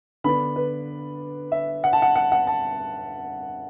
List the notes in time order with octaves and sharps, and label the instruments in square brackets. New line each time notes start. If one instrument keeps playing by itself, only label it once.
[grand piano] D3 B3 D4 B5
B4
E5
F#5
A5
F#5
F#5
F#5
A5